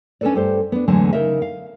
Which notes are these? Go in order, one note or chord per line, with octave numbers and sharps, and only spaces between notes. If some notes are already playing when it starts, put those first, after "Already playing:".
C#4 D4 G4 A4 B4 D5
G2 G4 A4 C5
B3 D4
E2 A2 D3 F#3 G#3 A3
C#3 D#4 A#4 E5
F5